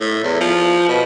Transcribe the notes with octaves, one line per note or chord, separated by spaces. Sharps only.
A2
E2
F3
B2